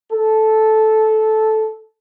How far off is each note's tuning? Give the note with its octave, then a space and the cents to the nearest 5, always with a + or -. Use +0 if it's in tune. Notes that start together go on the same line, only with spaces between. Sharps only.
A4 -10